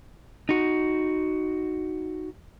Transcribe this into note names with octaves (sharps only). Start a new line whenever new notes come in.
D#4 F#4